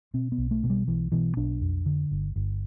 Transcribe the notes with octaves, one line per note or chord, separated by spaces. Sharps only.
B2 C4
B3
B1
A3
B2
G3
B1 E3
B2 E3
B1 D4
F2
D3
G1
G1